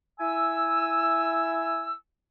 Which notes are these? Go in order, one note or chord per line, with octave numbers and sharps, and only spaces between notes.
E4 G#5 E6